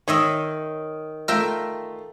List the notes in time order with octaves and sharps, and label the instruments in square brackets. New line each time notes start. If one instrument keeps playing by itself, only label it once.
[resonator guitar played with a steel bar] D#3 [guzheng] C#5 D#5 E5
[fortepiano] A3 F4 [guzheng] A#4 E5 G5